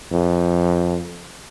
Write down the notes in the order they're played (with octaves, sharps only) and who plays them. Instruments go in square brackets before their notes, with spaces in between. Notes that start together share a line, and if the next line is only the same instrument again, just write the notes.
[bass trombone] F2